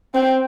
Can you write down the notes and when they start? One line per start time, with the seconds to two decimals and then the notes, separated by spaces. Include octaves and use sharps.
0.14 C4 G5